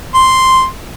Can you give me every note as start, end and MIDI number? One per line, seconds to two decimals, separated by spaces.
0.15 0.64 84